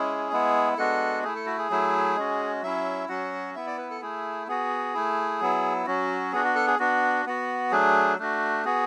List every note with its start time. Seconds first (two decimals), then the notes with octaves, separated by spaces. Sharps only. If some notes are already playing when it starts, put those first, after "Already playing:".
Already playing: G#3 C#4 E4 G#4
0.32 G#3 B3 E4
0.77 G#3 B3 D4 F#4 A4
1.24 A3 E4 G#4
1.35 A4
1.46 F#4
1.58 G#4
1.70 F#3 A3 E4
2.16 G#3 C#4 F#4
2.62 F#3 C#4 E4 E5
3.09 F#3 C#4 F#4 F#5
3.55 B3 E4 E5
3.67 D5
3.78 B4
3.90 A4
4.02 A3 E4 G#4
4.48 B3 F#4 G#4
4.94 A3 E4
5.41 F#3 B3 E4
5.86 F#3 C#4 F#4
6.32 B3 D4 F#4 G#4
6.45 F#4
6.55 A4
6.67 G#4
6.79 B3 D4 F#4
7.26 B3 F#4
7.71 F#3 A3 D4 G#4
8.18 A3 D4 F#4
8.65 B3 F#4 G#4